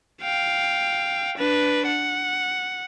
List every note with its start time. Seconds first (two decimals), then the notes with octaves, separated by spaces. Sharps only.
0.22 F5 G5
1.37 D4 B4
1.87 F#5